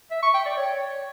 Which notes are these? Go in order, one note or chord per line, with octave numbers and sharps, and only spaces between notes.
E5
C#6
G5
D5
C#5